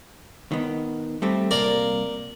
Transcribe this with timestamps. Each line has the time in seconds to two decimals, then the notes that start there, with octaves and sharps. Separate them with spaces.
0.52 D#3 B3
1.22 G3 A3 C4
1.51 C2 A#3 A#4 D5